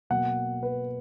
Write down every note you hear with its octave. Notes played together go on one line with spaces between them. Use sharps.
B2 F#3 A#3 F#5
B4